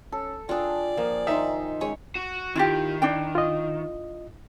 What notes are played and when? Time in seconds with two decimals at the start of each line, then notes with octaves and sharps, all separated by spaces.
0.12 C#4 A4
0.49 D4 F4 G#4 D5 G5
0.97 F3 A#3
1.27 D#3 D#4 E5 C6
1.81 G#3 C#4 G#4 C#5
2.15 F#4
2.56 D#3 E4 F4 G4
3.02 D4 E4 G5
3.35 F4 D#5